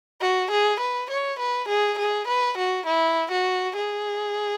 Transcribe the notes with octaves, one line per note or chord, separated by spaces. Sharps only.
F#4
G#4
B4
C#5
B4
G#4
G#4
B4
F#4
E4
F#4
G#4